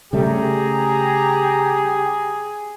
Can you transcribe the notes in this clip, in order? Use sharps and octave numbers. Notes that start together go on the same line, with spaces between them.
C#3 G3 A3 G4 G#4 A#5